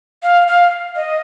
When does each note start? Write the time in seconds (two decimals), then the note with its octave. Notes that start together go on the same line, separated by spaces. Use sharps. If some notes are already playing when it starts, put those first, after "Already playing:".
0.23 F5
0.47 F5
0.96 D#5